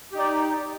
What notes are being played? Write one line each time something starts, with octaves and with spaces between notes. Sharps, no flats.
D#4 G4 D5